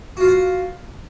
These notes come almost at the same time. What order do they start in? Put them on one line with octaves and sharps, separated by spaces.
F#4 F4 F5 F#5